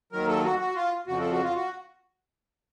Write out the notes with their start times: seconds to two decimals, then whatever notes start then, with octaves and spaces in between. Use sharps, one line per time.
0.12 D#2 D#3 F#3 A#4
0.28 A4
0.44 F#4
0.60 F#4
0.76 F4
1.07 F2 C#3 F3 F#4
1.20 A4
1.31 F#4
1.43 F4
1.55 F#4